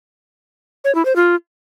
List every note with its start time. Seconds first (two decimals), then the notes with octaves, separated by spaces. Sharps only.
0.84 C#5
0.95 E4
1.05 C5
1.16 F4